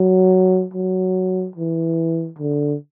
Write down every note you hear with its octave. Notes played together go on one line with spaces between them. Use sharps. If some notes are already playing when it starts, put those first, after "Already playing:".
Already playing: F#3
F#3
E3
D3